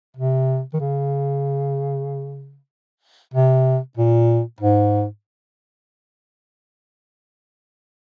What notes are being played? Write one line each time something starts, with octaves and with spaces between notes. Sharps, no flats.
C3
D#3
C#3
C3
A#2
G#2